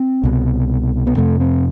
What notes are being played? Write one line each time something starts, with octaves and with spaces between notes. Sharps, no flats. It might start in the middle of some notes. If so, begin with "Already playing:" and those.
Already playing: C4
C2 B2
B3
F2 C3 A3
C4